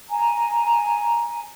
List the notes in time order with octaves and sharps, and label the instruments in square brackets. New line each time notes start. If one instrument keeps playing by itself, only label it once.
[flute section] G#5 A#5